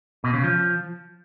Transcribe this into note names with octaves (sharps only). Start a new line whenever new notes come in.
B2
C#3
F3